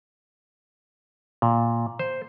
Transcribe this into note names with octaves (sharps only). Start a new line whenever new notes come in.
A#2
C5